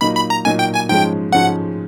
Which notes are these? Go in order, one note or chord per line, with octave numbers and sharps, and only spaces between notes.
A#2 F#3 A#3 D#4 B5
B5
A#5
A#2 F#3 A#3 D#4 G#5
G5
G#5
G#2 F3 G#3 C#4 G5
G#2 F3 G#3 C#4 F#5